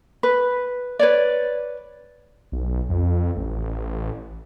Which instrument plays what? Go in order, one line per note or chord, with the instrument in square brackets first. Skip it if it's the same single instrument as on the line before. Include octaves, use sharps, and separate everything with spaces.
[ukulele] B4
B4 C#5 D5
[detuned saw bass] B1
F2
A1